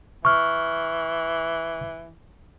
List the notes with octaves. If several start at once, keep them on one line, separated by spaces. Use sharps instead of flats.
E3 C#6 F6